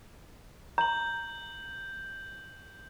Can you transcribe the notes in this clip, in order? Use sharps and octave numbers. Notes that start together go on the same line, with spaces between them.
A#5 G6 F#7